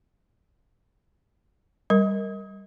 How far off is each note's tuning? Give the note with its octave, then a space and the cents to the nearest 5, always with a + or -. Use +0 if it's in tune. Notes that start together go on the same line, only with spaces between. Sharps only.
G3 +0 A#4 +0